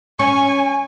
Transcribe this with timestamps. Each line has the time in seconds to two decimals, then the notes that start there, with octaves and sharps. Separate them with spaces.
0.19 C#4 G#5 C#6